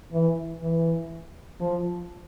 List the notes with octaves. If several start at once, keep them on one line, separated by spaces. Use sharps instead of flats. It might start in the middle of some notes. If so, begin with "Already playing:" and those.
E3
E3
F3